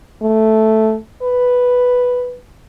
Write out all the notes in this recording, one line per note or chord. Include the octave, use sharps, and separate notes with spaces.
A3
B4